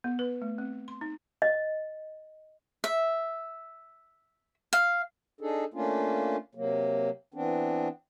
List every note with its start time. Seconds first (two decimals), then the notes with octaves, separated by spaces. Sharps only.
0.04 B3
0.19 B4
0.42 A3
0.58 C4
0.88 C6
1.01 D#4
1.42 D#5
2.84 E5
4.73 F5
5.41 D4 D#4 G#4 A4
5.74 A3 A#3 C#4 D4 F4
6.55 C3 F#3 A#3
7.34 E3 B3 C4 D4